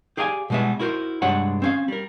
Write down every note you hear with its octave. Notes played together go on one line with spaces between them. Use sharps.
G4 G#4 D5 F5 G5 G#5
B2 G3 G#3 B3 E5
E4 F#4 A#4 C5
C2 G2 G#3 D4 C#5 F#5
C4 C#4 F5
G3 A#4